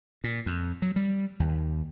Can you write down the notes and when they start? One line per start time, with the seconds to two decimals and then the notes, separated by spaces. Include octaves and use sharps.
0.24 A#2
0.46 F2
0.82 F#3
0.96 G3
1.40 D#2